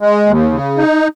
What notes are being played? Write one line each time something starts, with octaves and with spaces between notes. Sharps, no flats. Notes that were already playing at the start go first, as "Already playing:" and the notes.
G#3
D#2
C#3
D#4